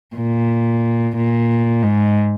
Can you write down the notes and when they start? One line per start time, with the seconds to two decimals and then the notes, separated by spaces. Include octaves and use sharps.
0.16 A#2
1.17 A#2
1.83 G#2